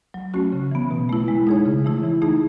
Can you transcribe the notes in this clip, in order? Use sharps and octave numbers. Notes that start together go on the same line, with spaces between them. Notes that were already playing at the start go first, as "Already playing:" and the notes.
F#3
A3 C#4 F#4
C#3
E3 B3
B2
A3 E4
G#3
D#4 G#4 C#5
C#3
E3 A3 E4
E3
A3 D#4 G#4